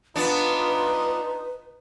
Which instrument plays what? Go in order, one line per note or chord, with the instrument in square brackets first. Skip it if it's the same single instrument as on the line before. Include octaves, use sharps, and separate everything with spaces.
[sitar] B3 D4 [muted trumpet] D#4 [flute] F4 [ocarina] B4